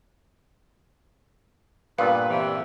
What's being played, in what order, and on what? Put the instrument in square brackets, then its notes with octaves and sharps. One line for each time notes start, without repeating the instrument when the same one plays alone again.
[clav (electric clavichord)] G2 A#2 B3 [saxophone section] B4 [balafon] F5
[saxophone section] C3 E3